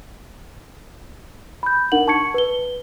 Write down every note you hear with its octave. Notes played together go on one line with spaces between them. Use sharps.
B5 G6
D4 D#4 A#4 F#5 F#7
A5 C#6 G#6 C#7
B4 G7